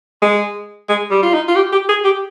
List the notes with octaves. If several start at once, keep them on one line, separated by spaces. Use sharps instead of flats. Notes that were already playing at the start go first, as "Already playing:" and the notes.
G#3
G#3
G3
F4
D#4
F4
G4
G4
G#4
G4